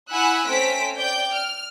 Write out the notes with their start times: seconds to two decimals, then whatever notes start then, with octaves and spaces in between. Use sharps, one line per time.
0.10 E4 F#5 G#5 B5 E6 F#6
0.46 A3 C4 C#4 C5 B6 D7
0.97 D5 G5 G6
1.34 F6